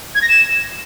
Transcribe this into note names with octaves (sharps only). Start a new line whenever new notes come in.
G#6
A#6
E7